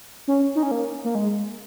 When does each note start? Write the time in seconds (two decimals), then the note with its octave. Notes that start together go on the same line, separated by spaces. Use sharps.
0.28 C#4
0.55 D#4
0.63 C#4
0.71 A#3
1.04 A#3
1.15 G#3